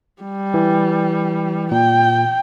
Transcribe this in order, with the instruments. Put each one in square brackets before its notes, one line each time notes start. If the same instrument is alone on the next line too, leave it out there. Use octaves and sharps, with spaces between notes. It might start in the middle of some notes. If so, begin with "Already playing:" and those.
[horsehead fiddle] G3
[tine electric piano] E3
[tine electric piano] A#2 [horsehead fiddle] G5